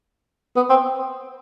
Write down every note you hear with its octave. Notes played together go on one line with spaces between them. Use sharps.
B3
C4